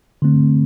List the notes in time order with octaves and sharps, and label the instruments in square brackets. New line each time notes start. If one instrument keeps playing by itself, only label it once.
[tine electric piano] D3 A3 C4